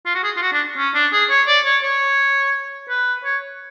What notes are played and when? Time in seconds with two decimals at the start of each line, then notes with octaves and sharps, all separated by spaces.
0.06 F4
0.15 F#4
0.24 G#4
0.37 F4
0.42 F#4
0.53 D4
0.77 C#4
0.94 D4
1.12 G#4
1.30 C#5
1.47 D5
1.65 C#5
1.83 C#5
2.89 B4
3.25 C#5